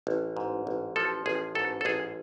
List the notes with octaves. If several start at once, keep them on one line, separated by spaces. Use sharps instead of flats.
A1
G#2
A1
F3 A4
A1 G#4
G#2 A4
A4
A1 G#4